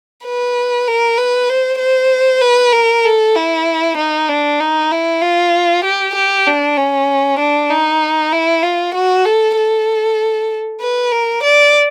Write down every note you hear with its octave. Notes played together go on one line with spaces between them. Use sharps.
B4
A#4
B4
C5
C5
B4
A#4
A4
E4
D#4
D4
D#4
E4
F4
G4
G4
D4
C#4
D4
D#4
E4
F4
F#4
A4
A4
B4
A#4
D5